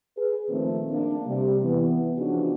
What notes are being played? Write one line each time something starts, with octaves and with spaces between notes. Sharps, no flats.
G#4 B4
A#2 D#3 F3 A3 C4
A#3 D4
C3 G3
E3 B3
C#3 F3 B3 D4 D#4 F#4